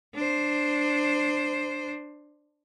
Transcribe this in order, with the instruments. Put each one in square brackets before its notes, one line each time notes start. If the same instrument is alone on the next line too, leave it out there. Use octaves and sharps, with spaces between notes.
[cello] D4 C5